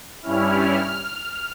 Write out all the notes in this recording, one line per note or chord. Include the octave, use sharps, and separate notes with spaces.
G2 G3 C#4 E4 F6